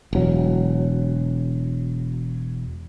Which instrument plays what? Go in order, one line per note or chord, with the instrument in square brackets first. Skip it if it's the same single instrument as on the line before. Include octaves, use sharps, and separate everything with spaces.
[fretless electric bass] E1 F#3